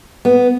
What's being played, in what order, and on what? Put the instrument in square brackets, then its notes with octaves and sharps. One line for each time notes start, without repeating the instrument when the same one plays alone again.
[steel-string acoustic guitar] B3